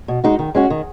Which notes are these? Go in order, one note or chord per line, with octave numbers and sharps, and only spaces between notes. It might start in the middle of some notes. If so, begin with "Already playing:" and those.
B2
G#3 D#4 F#4
D#3
G#3 C#4 F#4
D#3